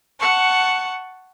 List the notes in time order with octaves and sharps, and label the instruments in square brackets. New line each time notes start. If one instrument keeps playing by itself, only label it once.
[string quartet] F#5 A5 C#6